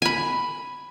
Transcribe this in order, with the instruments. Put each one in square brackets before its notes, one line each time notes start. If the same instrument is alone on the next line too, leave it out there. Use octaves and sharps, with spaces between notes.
[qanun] G#5 B5